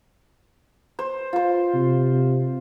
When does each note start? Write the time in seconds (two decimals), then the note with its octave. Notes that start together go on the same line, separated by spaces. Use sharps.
0.99 C5
1.33 F4 C5
1.74 C3